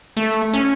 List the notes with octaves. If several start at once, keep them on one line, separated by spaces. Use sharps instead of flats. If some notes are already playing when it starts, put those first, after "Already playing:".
A3
C#4